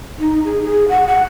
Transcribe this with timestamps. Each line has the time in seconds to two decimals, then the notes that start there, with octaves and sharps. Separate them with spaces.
0.19 D#4
0.45 G#4
0.65 G#4
0.88 F#5
1.07 F#5